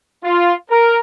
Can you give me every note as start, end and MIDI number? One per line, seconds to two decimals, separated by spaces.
0.24 0.53 65
0.70 0.99 70